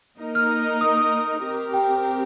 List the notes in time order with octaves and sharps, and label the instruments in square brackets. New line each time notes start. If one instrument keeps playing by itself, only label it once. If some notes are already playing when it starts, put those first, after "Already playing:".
[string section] A#3 D#4 A#4 D#5
[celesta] F6
D#6
D#6
[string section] C4 G4 A#4
[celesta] G5